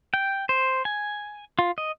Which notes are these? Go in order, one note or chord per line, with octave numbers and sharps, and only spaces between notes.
G5
C5
G#5
F4
D#5